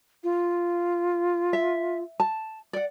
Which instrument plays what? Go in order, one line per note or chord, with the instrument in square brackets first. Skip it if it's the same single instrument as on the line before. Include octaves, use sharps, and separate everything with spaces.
[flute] F4
[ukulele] E5
A5
D5 F#5